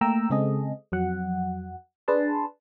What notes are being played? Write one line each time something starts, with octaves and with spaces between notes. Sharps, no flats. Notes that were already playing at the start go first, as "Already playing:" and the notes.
A3 A#3 G5 A#5 E6
C#3 G#3 C4 G#4 A4 D#5
F2 F#3 F#5
D4 G#4 B4 A5 C6